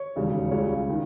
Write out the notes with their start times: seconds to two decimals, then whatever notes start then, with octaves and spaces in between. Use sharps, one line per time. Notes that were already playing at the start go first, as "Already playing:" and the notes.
Already playing: C#5
0.16 E1 D#2 C#3 G3
0.51 C#2 C#3 G3 C#5
0.90 D#3